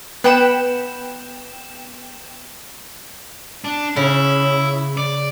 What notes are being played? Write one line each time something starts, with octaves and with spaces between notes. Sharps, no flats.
B3 B4 F#5 G5 B5 E7
D4
C#3 E4
D5